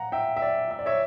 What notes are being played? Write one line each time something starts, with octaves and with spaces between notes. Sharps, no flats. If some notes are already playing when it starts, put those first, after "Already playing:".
Already playing: F#5 A#5
E5 G5
E5
D5
E5
D5
C#5 E5